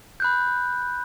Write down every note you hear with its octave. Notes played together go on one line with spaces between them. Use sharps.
B5 F#6 G6